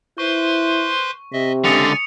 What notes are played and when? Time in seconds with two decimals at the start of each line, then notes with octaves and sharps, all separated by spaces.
0.18 E4 B4 C5 C6 C#6
1.33 C3 D#5 E5
1.64 C#2 D3 G#5 D#6 A6 C#7 F7